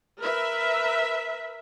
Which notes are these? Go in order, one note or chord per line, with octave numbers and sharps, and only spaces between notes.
A#4 B4 E5